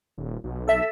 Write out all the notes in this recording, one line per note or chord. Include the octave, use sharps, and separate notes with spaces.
D#1
B1
A4 E5